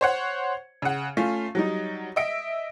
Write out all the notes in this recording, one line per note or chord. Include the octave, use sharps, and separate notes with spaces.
C5 C#5 F#5
C#3 F#5
A3 C#4 F4
F#3 G3 D#4
D#5 E5 D7